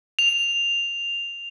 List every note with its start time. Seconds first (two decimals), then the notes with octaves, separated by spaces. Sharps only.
0.19 F7